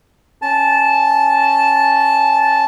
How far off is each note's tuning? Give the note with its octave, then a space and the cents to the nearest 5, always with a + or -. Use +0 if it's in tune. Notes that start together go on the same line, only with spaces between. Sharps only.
C#4 +0 A5 -10